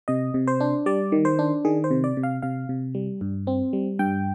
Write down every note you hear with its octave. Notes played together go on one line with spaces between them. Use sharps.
C3 D#5
C3
C5
D4
G3 D5
D#3
C5
D4
D#3 G#4
C5
C3
D5
C3
F5
C3 F5
C3
G3
G2
C4
G3
G2 G5